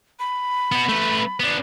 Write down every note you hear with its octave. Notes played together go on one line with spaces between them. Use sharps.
B5
B3 F#4
A3 B4
B3 D4